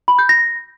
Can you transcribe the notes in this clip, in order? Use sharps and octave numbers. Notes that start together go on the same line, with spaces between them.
B5
G6
A#6